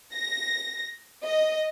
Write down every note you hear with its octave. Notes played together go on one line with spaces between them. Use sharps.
A#6
D#5